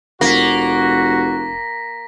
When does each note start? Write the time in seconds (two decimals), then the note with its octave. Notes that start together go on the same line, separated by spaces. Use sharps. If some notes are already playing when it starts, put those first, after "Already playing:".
0.21 F1 A#3 F#4 A#6 B6